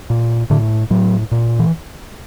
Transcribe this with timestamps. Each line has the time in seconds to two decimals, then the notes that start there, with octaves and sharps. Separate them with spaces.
0.10 A#2
0.50 A2 D3
0.90 A2 F#3
1.31 A#2
1.59 E3